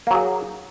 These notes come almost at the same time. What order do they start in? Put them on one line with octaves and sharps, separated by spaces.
A#3 F#3 G#4